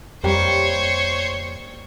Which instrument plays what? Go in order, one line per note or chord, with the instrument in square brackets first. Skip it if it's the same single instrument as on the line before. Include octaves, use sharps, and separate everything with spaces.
[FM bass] F2 [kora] G3 A#3 [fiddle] C5 C#5